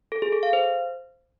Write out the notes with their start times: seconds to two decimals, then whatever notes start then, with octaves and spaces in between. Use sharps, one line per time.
0.12 A4
0.22 G#4
0.32 A4
0.43 F5
0.53 C5